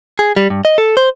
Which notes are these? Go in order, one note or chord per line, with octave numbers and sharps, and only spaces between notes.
G#4
G3
G2
D#5
A4
C5